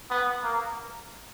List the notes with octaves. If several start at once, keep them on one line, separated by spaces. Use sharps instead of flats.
B3
A#3